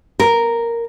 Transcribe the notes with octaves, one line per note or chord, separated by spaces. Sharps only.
A#4